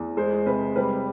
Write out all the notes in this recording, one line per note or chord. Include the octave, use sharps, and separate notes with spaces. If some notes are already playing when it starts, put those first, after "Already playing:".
Already playing: E2
G#3 C5
C3 B4
G3 B4